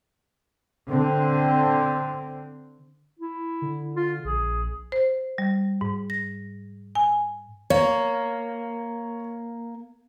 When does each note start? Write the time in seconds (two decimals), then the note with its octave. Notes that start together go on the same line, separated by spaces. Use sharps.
0.89 D3 C4
3.19 E4
3.62 D3
3.96 F4
4.24 A#1 G#4
4.92 C5
5.38 G3
5.81 G#2
6.10 A#6
6.95 G#5
7.70 A#3 C#5